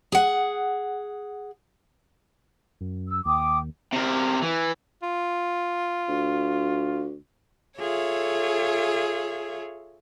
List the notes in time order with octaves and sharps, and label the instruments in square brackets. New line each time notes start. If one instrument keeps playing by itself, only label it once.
[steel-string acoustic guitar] G#4 F#5
[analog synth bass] F#2
[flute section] E6
[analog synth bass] D#2 [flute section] G5 D6 D#6
[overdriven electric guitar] C3 A#4
E3
[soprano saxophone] F4
[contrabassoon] D2
[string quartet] F4 G#4 A4 C#5 E5